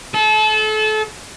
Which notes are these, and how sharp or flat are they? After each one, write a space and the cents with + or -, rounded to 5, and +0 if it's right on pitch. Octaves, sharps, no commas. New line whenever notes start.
A4 -30